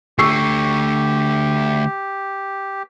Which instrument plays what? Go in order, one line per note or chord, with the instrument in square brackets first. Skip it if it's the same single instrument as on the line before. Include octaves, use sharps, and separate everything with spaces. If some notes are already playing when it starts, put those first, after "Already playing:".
[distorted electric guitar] D3 A3 [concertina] G4 [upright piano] C#6 E6 C7